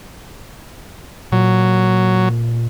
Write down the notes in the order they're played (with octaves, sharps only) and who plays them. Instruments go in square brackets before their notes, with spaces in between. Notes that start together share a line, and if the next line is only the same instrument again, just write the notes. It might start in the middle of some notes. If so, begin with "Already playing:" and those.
[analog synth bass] A#2 [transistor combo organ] F#3